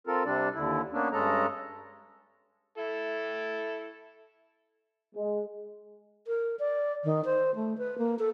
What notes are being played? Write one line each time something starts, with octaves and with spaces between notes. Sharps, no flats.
C4 F4 A4 A#4
C3 G3 D4 D5
D#2 D3 E4
A#3 B3 C#4 D4
G2 G#3 C#4 A4 D#5 A#5
E4 A4
G#3
A#4
D5
D#3
C5
A3
B4
A#3
A4